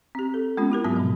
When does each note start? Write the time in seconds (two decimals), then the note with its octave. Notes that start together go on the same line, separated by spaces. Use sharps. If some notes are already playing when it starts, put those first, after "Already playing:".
0.15 C4 G4
0.34 A4
0.57 G#3 A3 B3 C#4 F4
0.72 E4 G4 A#4
0.84 G#2 F#3 B3 A5 D#6
0.96 B2 F3